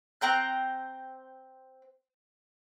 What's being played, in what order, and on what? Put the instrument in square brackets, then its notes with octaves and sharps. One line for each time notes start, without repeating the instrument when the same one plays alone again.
[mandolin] C4 G5 A#5 F#6